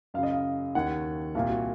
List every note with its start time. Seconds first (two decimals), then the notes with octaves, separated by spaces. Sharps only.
0.14 F#2 F5
0.18 C#3 D#5
0.31 F5
0.75 D#2 D#3 F#5
1.35 C2 A#2 F5
1.50 F#4